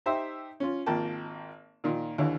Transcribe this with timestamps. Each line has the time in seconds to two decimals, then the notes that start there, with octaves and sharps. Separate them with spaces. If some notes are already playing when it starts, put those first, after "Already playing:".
0.06 D#4 G4 C5 E5
0.60 C#4 F4
0.86 G#1 F3 A#3 G5 A5
1.84 A#2 D#3 F3
2.18 D#2 D3 E3 C#5